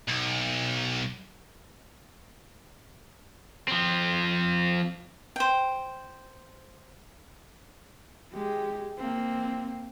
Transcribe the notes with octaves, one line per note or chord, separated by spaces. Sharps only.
B1
F3 C4
C5 G5
G#3 G4
A#3 C4